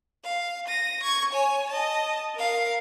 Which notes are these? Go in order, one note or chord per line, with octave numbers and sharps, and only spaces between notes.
F5
A#6 D#7
C#6 G#6
C#5 G#5
D#5 A5
A#4 F5